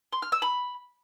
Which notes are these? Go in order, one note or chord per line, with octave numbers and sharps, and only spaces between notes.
C6
F6
E6
B5